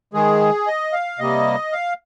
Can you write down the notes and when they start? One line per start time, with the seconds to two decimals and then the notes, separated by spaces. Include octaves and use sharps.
0.14 D#3 G#3 G#4
0.67 D#5
0.93 F5
1.19 C3 G3 A#3 D#5
1.72 F5